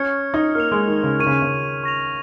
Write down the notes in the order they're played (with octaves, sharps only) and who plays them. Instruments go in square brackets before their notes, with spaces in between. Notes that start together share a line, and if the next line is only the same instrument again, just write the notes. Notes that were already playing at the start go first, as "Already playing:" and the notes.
Already playing: [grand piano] C#4 [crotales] C#6 F6 G#6 C#7
[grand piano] D#4
[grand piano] A#3 [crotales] F6 C#7 F7
[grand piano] G#3
D#3
C#3
[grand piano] D#3 [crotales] C#6 G#6 D#7
[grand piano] C#3
C#3
[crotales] C#6 A#6 F7